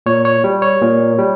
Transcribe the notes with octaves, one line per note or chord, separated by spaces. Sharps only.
A#2 C#5
C#5
G3
C#5
A#2
G3